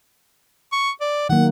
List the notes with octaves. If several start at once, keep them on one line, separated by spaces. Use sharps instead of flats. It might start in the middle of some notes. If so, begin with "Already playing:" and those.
C#6
D5
D#3 F#3 A#3 F#5